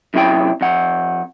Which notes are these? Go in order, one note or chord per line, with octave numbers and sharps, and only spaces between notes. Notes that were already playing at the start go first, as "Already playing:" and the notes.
F#2 C3 E4 G4 G5
F2 F#5